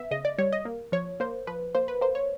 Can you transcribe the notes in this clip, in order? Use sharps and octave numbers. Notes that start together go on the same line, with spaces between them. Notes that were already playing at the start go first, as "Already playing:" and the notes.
Already playing: B3 E5
C#3 D#5
D5
G3 C#5
D#5
A#3
F3 C#5
A#3 C5
F3 B4
A#3 C5
B4
A#3 C5
C#5